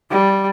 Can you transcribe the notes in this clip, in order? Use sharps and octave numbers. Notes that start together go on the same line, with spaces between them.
G3